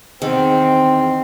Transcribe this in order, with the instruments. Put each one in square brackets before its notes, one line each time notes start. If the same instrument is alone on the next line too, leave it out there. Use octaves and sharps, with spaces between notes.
[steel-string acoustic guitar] E2 D#3 [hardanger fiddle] C4